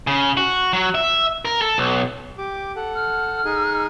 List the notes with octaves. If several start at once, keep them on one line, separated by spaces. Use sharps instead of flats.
C#3
F#4
F#3
E5
A#4
A4
B1
G4 D6
A4 F#5
F6
D#4 G#4